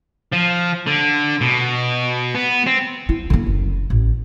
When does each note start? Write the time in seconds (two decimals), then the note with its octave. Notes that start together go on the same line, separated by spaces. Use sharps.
0.33 F3
0.87 D3
1.41 B2
2.35 B3
2.67 C4
3.09 E4
3.30 D3 A#3
3.46 F#1
3.90 A1